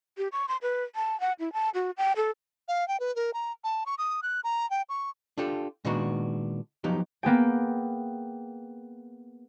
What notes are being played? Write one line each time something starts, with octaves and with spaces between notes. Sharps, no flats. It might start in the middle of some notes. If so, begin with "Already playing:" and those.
G4
C#6
C6
B4
A5
F#5
E4
A5
F#4
G5
A4
F5
G5
B4
A#4
A#5
A5
C#6
D#6
F#6
A#5
G5
C#6
D4 F4 G4 A4
A#2 D#3 G#3 B3 D4 F#4
F3 F#3 B3 D#4 G4
A#3 B3 G#4 G5